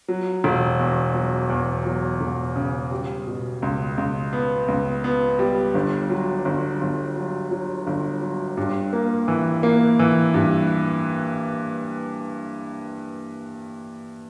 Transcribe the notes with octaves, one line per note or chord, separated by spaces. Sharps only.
F#3
E1
E2
F#3
E2
F#3
E1
C#3
G3
B2
C#2
C#2
B3
C#2
B3
G3
G1
F#3
G1
G1
F#3
F#3
G1
F#3
G2
A#3
E3
A#3
E3
G2